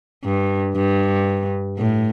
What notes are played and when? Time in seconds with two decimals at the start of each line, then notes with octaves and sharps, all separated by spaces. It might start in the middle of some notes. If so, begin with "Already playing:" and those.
0.24 G2
0.75 G2
1.78 A2